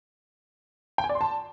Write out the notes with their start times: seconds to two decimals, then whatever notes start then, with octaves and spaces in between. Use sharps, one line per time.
0.98 G5
1.04 G#5
1.09 D5
1.15 C6
1.21 A5